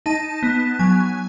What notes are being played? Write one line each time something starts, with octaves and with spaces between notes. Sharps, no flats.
D#4 A5
B3
F#3 G#5